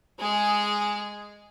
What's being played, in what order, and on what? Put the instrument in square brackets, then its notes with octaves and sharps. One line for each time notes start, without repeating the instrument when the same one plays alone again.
[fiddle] G#3 G#4